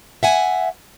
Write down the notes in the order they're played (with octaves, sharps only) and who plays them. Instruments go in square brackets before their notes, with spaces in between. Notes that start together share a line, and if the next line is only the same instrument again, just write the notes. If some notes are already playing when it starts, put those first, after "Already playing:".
[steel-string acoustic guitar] E5 F#5 G#5